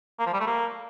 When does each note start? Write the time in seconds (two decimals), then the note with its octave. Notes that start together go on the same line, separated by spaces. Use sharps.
0.19 A#3
0.26 F3
0.33 G3
0.40 A3
0.47 A#3